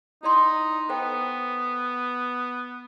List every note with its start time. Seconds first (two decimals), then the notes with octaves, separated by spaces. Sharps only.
0.23 D#4 E4 D5 C6
0.89 B3 A4 C5 G5